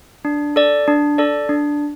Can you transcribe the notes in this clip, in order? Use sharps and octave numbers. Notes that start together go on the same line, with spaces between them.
D4
A4 D5
D4
A4 D5
D4